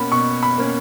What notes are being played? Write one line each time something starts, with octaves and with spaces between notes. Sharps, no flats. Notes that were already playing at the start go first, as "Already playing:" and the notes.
Already playing: B2 A#3 C#4 B5
B2 C#6
B5
A#3 C#4